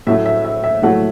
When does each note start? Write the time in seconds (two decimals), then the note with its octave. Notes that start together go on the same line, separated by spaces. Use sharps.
0.07 A2 F#3 A3 E5
0.26 E5
0.45 E5
0.64 E5
0.82 A2 F#3 A3 F#5